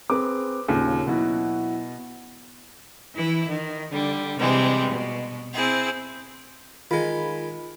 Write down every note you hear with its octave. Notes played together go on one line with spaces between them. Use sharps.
C4 G#4 B4 D6
D#2 A#2 C#3
B2 F#3 E4 F#4
E3 E4
D#3
D3 G3
C3 E3 G3 G#3
B2
C4 E4 G#4
D#3 G#3 F4 B5